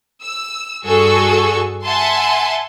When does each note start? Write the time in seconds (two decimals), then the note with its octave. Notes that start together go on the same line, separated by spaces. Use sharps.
0.23 E6
0.85 G2 F#4 G#4 A4 C#6 E6
1.84 E5 F#5 G#5 A5 C6